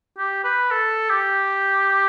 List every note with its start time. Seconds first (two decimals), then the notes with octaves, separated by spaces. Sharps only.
0.18 G4
0.44 B4
0.71 A4
1.09 G4